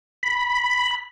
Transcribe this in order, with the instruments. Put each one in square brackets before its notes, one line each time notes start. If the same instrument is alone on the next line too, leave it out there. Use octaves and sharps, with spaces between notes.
[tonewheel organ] B5